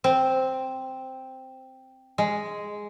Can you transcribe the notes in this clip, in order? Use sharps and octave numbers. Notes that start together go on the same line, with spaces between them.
C4
G#3